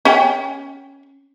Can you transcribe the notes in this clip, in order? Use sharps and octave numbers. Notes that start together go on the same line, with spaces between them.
C#4 F#5 G5